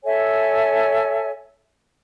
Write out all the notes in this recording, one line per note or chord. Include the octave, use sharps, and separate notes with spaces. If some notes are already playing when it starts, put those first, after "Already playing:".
A4 C#5 E5 G#5